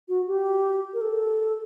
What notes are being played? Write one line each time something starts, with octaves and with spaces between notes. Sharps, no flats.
F#4
G4
A#4
A4